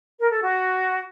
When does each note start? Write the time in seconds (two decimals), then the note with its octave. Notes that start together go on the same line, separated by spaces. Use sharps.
0.19 A#4
0.30 A4
0.41 F#4